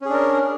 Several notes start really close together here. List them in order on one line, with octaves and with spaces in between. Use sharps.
C#4 G#4 D4 A#4